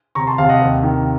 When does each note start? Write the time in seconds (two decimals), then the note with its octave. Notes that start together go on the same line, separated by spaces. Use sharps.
0.15 C3 A#5 C#6
0.27 A5 C6
0.38 C3 F5 A5
0.49 D#5 F#5
0.61 D#2
0.83 D#3